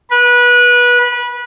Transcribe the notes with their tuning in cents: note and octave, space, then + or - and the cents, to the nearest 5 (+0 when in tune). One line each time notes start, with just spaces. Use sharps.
B4 -25